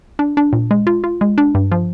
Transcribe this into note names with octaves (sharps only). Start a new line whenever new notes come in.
D4
D4
A#2
G#3
F4
F4
G#3
D4
G2
F3